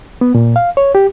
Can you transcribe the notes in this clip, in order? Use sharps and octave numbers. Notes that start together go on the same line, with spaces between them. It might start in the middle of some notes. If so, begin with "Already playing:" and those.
B3
A#2
F5
C#5
G4